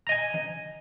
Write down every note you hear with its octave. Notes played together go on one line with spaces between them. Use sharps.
D#5 G#5 A#5